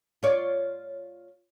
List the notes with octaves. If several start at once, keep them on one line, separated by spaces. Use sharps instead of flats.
F4 C#5 D5